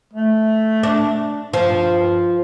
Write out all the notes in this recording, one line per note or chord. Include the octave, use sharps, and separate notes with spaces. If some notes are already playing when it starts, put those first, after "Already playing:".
A3
D4
G2 F3